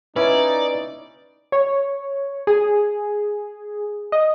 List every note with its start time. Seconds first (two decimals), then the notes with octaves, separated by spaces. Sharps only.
0.16 C#4 D#4 E4 B4 D5 E5
1.52 C#5
2.47 G#4
4.12 D#5